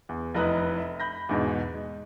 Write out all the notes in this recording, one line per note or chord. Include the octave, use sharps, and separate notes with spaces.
E2
F1 E4 B4 D#5 A#5 F#6
E5
B5 G6 A#6
E2 G#2 B2
G#3